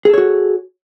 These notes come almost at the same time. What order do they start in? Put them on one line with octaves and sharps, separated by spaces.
G#4 A4 C#5 F#4